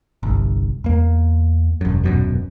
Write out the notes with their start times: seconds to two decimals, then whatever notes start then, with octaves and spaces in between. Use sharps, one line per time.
0.23 G1 C2
0.84 E2 A#3
1.81 E1 F#2
2.04 D#1 F#2 B2